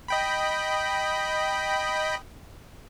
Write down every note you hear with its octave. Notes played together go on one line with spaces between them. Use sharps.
D#5 G5 B5